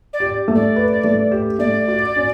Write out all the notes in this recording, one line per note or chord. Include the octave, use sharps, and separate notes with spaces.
D5
G4
A3
D5
B4
A3
G4
A3 D5
F#4
C#4